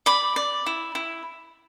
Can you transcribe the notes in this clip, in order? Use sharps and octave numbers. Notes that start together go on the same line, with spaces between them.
D5 B5
D5
E4
E4